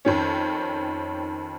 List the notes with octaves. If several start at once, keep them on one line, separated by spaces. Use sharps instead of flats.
F2 D#3 C#4